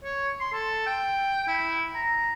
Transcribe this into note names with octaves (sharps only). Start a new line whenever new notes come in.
C#5
C6
A4
G5
E4
A#5